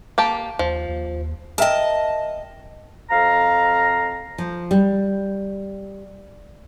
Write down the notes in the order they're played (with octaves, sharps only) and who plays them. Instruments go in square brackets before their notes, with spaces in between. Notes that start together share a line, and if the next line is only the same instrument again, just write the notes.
[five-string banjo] A#3 G4 A5
[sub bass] D#2 [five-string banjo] F3
[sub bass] D#2
[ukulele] A#4 E5 G5 [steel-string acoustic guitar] D#5 A5
[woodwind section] F2 F5 A#5
[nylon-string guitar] F3
G3